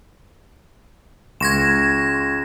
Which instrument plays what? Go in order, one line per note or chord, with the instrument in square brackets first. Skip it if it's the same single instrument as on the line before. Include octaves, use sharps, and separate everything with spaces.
[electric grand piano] C#2 C6 C#6 [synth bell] G#6 A#6 E7